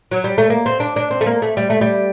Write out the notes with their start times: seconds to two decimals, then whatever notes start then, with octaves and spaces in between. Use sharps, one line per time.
0.11 F#3
0.24 G3
0.38 A3
0.50 A#3
0.66 C4
0.80 D4
0.96 D4
1.11 C4
1.21 A3
1.26 A#3
1.42 A3
1.57 G3
1.70 A3
1.81 G3